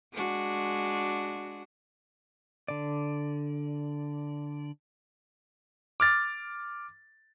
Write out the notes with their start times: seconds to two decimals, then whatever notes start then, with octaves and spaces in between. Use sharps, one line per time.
0.13 G#3 D4 F#4
2.68 D3 D5
6.00 D6 F6 A6